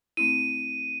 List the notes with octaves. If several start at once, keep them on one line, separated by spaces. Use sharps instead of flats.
A3 C4 E4 D#7